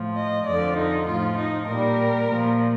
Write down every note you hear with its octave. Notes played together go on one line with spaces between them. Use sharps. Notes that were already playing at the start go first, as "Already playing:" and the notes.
Already playing: A2 F3
D#5
F2 D3 F3 D5
D#4
A2 F3 F4
D#4
A#2 G3 A#4
A#2 F3